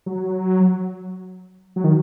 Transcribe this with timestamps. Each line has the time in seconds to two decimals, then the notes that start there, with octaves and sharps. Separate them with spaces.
0.06 F#3
1.76 F#3
1.84 D#3